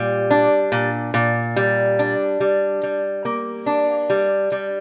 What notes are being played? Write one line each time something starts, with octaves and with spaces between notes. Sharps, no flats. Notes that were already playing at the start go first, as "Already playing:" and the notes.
Already playing: A#2 G3
D4
A#2
A#2
G3
D4
G3
G3
A#3
D4
G3
G3